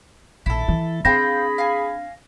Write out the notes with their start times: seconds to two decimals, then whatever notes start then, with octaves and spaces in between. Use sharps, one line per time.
0.46 A#1 D#3 E4 A4
0.68 E3
1.05 C4 D4 G#4 C5 F5 G5 B5 A#6
1.58 F5 G#5